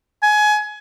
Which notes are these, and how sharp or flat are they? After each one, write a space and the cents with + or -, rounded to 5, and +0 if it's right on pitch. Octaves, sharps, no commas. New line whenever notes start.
G#5 +25